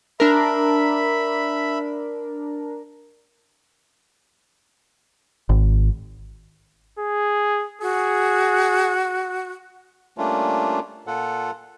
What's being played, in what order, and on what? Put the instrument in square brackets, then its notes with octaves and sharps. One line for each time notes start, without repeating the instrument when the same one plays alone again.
[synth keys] D4 A#4 [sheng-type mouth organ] E5 B5
[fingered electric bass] G#1
[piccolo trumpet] G#4
[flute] F#4 [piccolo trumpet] G#4
[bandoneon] G3 A3 A#3 C#4 D4 F4
A#2 F4 A4 F#5